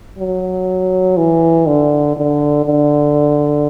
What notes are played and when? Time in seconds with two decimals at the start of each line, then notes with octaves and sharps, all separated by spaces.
0.18 F#3
1.17 E3
1.67 D3
2.16 D3
2.66 D3